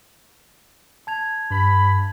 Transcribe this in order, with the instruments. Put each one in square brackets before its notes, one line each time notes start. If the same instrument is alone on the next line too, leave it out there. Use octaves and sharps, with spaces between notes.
[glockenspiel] A5 G#6 F7
[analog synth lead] G2 [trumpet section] B5